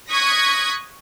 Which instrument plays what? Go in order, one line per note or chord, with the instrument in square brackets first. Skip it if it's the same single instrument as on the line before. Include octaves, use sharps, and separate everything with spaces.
[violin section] C#6 D#6 F#6 G#6 A#6 B6